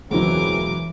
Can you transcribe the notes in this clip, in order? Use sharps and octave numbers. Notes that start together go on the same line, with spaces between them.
E1 C#2 E3 F#3 C4 A#4 D6